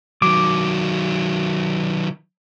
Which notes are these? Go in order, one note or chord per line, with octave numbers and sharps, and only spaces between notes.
D#3 F#3 D6